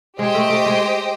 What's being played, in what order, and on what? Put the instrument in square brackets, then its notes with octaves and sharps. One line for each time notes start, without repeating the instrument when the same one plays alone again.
[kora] G#3 [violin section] G4 C5 D#5 G5
[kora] A3
A3
G#3